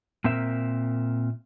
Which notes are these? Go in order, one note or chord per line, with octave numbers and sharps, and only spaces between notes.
A#2 C4 A#4 E5